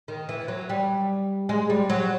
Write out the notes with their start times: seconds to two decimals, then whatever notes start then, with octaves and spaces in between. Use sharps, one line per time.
0.08 D#3
0.29 E3
0.48 F#3
0.69 G3
1.49 G#3
1.70 G3
1.90 F#3